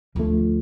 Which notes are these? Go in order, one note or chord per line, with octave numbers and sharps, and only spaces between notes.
D2 D3 F3 A3